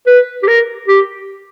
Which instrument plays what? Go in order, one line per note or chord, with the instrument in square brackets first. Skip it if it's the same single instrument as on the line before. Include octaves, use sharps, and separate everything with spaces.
[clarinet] B4
G4
A#4
G4